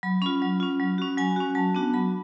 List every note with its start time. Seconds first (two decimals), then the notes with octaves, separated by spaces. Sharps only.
0.03 F#3 B5
0.22 C#4 F4 B5
0.42 F#3
0.60 C#4 F4
0.80 F#3
0.98 C#4 F#4
1.18 F#3 G#5
1.36 C#4 F#4
1.55 F#3 A5
1.75 B3 D4 F#4
1.94 F#3 B5